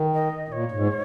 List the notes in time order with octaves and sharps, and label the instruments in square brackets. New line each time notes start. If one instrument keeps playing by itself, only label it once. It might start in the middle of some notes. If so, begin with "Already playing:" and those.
Already playing: [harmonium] D#3
[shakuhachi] D#5
[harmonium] A#2 [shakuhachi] C#5 D#5
[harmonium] G#2